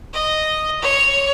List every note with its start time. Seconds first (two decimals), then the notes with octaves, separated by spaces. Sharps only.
0.14 D#5
0.81 C#5